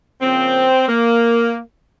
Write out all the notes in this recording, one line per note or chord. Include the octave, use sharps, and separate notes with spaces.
C#3 F3 A#3 C4
A#3